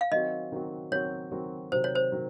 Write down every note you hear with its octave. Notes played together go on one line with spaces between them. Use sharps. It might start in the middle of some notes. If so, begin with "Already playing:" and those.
F5
D#3 F#3 C4 F#4 D#5
D#3 F#3 C4 F#4
D#3 F#3 C4 F#4 C#5
D#3 F#3 C4 F#4
C3 D#3 F#3 C5
C#5
C5
D#3 F#3